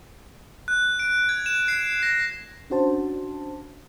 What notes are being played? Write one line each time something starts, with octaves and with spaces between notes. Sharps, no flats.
F#6
D7
G#6
E7
C7
A#6
C#4 D4 F#4 C5 A5